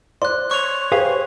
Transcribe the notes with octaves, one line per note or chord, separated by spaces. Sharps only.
C5 D5 C6 F#6
C#5 C#6 F7
G4 G#4 B4 C5 F5